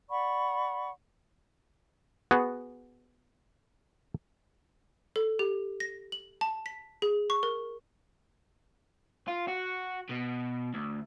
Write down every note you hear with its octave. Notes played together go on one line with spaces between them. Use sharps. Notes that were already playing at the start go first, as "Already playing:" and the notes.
D5 F#5 B5 C#6
B3 F#4 G#4
A4
G4
A#6
F#7
A5
B6
G#4
C#6
A#4
F4
F#4
B2
D2